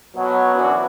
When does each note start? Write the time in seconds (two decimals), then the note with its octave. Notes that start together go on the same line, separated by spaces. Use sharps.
0.16 B2 F#3
0.54 F#2 E3 C#4 D4 F#4